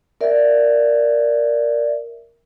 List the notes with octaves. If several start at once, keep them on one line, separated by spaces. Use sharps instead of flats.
A#4 D5 E5